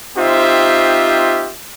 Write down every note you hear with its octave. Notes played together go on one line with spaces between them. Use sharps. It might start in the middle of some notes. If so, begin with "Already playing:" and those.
C4 D#4 F4 G4 C5 E5